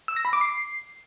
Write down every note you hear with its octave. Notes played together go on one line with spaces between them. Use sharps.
E6
A#6
B5
D6
C7